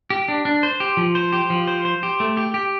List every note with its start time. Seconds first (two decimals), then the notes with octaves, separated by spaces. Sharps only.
0.10 G4
0.28 D4
0.45 D4
0.63 C5
0.80 G4
0.97 F3
1.15 C5
1.32 G4
1.50 F3
1.68 C5
1.85 C5
2.03 G4
2.20 A3
2.37 G4
2.54 G4